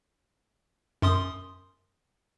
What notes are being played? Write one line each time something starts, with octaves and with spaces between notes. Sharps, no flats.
F#2 C6 D#6